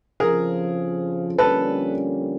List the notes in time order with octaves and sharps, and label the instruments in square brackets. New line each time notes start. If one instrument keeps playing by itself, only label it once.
[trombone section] F2 C#3 F3 [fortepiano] G#4 A#4
[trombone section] F2 D3 G3 A#3 C#4 [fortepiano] A4 B4